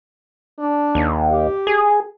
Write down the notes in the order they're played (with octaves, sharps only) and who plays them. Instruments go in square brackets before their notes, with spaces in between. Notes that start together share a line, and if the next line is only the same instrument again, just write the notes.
[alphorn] D4
[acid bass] D#2
[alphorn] G4
[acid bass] G#4